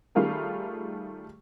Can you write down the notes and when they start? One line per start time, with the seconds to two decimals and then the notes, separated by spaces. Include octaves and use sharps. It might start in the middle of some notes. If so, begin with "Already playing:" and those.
0.15 D#3 G3 A3 F4 G#4 A#4